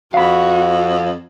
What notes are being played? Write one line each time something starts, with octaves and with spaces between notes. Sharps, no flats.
F2 F#4 F5 B5